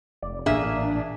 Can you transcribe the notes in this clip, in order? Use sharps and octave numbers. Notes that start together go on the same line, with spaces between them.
F1 D5
A1 A#2 A#3 D4 G#4 E5